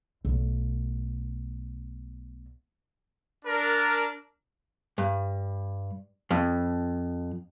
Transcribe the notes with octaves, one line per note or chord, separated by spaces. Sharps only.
B1 A3
D4 A#4
G2
F2